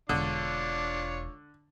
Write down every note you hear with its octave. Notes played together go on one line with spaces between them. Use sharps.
E1 D3 D4 F4 C#5